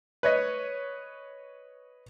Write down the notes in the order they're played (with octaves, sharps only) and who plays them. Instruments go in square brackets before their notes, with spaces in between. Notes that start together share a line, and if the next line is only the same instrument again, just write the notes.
[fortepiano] B4 C#5 D#5